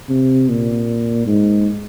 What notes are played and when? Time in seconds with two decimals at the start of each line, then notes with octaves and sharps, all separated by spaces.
0.09 C3
0.49 A#2
1.26 G#2